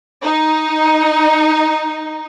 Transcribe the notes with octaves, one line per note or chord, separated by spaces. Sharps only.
D#4